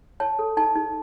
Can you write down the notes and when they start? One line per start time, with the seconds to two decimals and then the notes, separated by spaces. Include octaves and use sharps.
0.20 C#5 A5
0.39 A4
0.57 D#4 A5
0.76 D#4